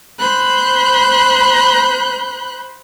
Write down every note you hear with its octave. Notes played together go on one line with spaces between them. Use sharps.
C5 B5 F#6 G6